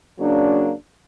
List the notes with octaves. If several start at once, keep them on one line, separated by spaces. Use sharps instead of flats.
C#3 F#3 A#3 D4